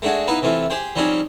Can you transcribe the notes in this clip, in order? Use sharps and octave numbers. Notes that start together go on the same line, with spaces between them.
G#3 A3 D4 F#4 G#4
B3 D#4 E4 B4 F5
C3 E3 A3 F4
G4 G#4 C5 G5
F3 G3 C4 C#4 D#4 G#4